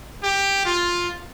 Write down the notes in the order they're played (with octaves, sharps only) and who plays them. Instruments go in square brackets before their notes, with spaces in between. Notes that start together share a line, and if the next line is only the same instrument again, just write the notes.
[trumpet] G4
F4